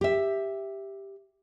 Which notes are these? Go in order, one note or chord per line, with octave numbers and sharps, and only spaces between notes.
G4 E5